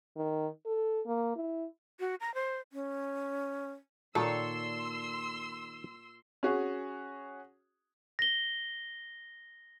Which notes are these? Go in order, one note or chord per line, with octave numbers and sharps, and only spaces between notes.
D#3
A4
A#3
E4
F#4
A#5
C5
C#4
A#2 D#3 A4 C#5 D5 C6 E6
C#4 F#4 G#4
A#6 G7